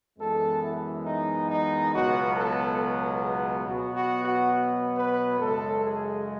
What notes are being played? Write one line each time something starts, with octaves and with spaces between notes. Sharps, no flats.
F#2 E3 G#3 B3 A4
E4
D#4
D#4
C#2 B2 F#3 B3 F#4
A4
G#4
B2 F#3 B3 F#4
F#4
F#4
B4
F#2 C#3 G#3 A4
G#4